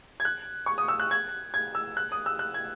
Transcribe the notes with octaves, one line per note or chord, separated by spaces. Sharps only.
G#6
F#6
C#6
D#6
E6
F#6
G#6
G#6
E6
F#6
D#6
E6
F#6
G#6